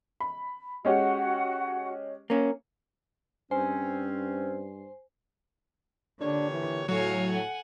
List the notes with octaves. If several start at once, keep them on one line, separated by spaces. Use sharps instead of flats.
B5
G#3 C#4 F#4 G4 F#5
A#3 C#4
G2 C4 C#4 C5 G#5
A#2 D3 D4 G4 C#5
E3
A2 F#3 F#4 A4 C#5 F5 G#5
F#5 G#5